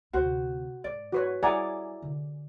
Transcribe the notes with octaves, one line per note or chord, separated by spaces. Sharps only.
D2 C3 F#4 C5
G#2 D5
F#4 B4 C#5
G3 C#4 E4 G#4 D5 F#5 G#5 A#5
D3